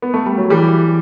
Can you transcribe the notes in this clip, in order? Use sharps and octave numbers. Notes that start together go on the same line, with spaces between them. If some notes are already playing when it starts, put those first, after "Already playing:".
B3
A3
G3
F#3
E3 G3